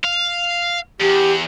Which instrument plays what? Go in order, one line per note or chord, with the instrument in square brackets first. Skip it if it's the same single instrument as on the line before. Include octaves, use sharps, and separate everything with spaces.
[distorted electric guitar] F5
[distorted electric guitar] E2 [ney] G4